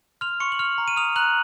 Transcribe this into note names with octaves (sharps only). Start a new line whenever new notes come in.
C6 F6 F7
C6 C#6 C#7
F#7
F6 F7
A#5
D#7
D#6 F6 F7
A#5 F#6 F#7